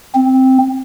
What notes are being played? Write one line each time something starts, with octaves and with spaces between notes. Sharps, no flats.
C4